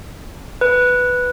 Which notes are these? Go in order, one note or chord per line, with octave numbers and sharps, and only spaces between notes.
B4